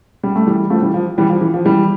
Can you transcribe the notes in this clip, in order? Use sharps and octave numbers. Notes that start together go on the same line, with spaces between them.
G3
A3
E3 G3
F3 A3
E3 G3
F3
E3 G3
F3
E3
F3
E3 G3